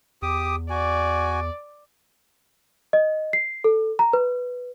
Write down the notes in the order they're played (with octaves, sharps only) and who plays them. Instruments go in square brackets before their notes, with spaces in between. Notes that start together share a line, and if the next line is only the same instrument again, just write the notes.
[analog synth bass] E2 [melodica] G4 D6 D#6
[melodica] F#4 G#5 [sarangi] D5
[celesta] D#5
C7
A4
A#5
B4